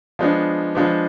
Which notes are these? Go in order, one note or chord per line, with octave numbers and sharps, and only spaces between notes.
F3 G#3 B3 D4
F3 G#3 B3 D4